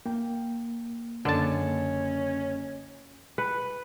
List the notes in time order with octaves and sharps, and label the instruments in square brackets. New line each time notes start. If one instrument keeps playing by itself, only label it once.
[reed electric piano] A#3 [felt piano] G5
[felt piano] F#1 [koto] D3 A5 [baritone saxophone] C#4
[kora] B4